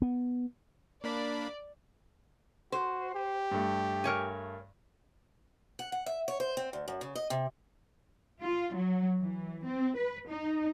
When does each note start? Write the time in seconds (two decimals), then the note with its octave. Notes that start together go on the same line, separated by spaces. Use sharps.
0.02 B3
1.04 A#3 D4 D5 B5
2.72 F#4 C5
3.14 G4
3.51 G2 A3
4.04 A#4 C#5 G#5
5.79 F#5
5.92 F#5
6.06 E5
6.28 C#5
6.40 C5
6.57 C4
6.73 D2
6.88 F#2
7.01 C#3
7.15 D#5
7.30 C3
8.41 F4
8.75 F#3
9.21 E3
9.66 C4
9.96 B4
10.29 D#4